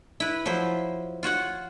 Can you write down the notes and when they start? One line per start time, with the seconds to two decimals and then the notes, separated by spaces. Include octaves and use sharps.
0.20 E4 B4
0.46 F3 F#3 E4 C5
1.23 F4 F#4 C#5 F#5